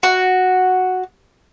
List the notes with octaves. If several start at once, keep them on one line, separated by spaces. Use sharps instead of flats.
F#4